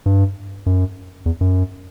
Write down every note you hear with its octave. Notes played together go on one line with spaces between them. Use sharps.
G2
F#2
E2
F#2